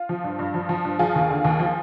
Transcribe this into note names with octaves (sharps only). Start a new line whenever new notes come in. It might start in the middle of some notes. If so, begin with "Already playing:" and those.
Already playing: F4
F3
G2
G2
F3
F3
G2
F3 F4 G#4
D#2
D3
D#2
F3